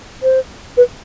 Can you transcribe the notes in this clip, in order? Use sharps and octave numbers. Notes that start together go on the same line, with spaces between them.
C5
B4